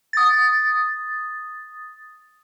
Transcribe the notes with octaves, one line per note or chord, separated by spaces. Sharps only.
D#6 A6